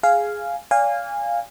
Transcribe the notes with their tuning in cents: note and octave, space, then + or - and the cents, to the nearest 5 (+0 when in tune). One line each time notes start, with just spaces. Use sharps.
G#4 +0 F5 -5 G#5 +0
D5 -35 F5 +0 G#5 -25